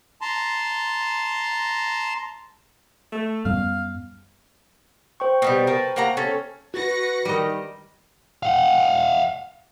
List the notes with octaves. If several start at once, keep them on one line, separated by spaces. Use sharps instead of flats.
A5 A#5 C6
A3
F#2 G3 B3 F5
C5 G5 C#6
B2 D#3 G3
A#4 B4 A5
A#3 F#5 A#5
C#4 A4
F#4 B4 A#6 C#7
D#3 G3 D#5
F5 F#5